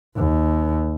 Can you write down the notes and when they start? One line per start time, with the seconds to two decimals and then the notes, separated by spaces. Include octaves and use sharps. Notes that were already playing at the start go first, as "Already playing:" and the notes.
0.16 D#2